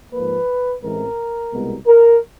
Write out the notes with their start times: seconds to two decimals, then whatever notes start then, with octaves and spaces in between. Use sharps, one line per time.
0.12 G#2 F3 A#3 B4
0.83 A1 A2 E3 G#3 C4 A#4
1.52 C2 B2 G#3 B3
1.87 A#4